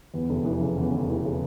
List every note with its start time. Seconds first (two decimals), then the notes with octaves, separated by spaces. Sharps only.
0.14 E2
0.29 F1
0.45 E3
0.61 C#3
0.77 E2
0.93 F1
1.09 E3
1.24 C#3